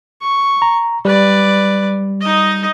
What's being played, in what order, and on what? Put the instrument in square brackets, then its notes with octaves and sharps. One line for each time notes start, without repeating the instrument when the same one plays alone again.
[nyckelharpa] C#6
[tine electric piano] A#5
[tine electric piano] G3 [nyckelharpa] B4 D5
[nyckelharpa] D#4 D#5